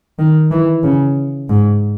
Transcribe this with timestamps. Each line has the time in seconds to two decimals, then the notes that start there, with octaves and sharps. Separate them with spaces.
0.19 D#3
0.51 E3
0.83 C#3
1.49 G#2